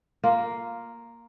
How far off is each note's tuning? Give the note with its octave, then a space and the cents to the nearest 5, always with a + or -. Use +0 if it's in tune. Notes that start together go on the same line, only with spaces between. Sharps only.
A#3 +0 F4 +0